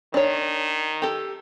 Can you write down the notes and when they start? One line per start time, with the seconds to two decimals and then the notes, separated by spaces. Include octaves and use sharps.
0.14 D#3 D4 C#5
1.02 G4 A4